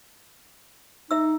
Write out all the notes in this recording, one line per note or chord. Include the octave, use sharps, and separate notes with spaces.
D#4 E5 E6